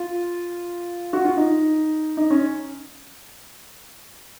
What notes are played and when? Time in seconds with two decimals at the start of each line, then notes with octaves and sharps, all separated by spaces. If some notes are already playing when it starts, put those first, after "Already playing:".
Already playing: F4
1.13 F#4
1.25 F4
1.37 D#4
2.17 D#4
2.31 C#4